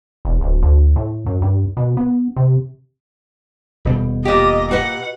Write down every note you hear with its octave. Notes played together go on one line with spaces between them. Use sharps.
E1
D1
D2
A2
F#2
G2
B2
B3
C3
D#1 B2 G3
A#2 G4 D#5
F#4 B4 D#5 F#5